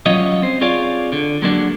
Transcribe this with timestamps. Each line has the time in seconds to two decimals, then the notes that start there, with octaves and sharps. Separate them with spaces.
0.06 F#3 G3 C#4 F4 C#5 D#5
0.42 C4 C5
0.61 C4 F4 G#4 C#5 D5 F5
1.12 D3
1.42 F#3 G#3 A#3 D4 F#4